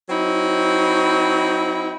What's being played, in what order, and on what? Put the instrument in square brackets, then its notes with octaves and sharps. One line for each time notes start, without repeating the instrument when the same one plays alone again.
[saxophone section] F#3 C4 D#4 E4